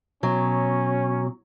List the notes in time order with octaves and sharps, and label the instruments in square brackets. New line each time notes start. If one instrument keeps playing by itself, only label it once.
[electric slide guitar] B2 [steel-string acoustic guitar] F#3 [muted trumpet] C#4